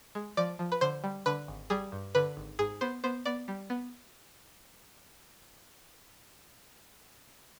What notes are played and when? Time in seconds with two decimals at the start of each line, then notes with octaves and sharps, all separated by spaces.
0.15 G#3
0.37 F3 D5
0.59 F3
0.72 B4
0.81 D3 C5
1.04 G3
1.26 D3 B4
1.48 G#1
1.70 G3 G#4
1.92 G2
2.15 D3 B4
2.37 G#1
2.59 G#2 G#4
2.81 B3 C5
3.04 B3 C5
3.25 B3 D5
3.48 G3
3.70 B3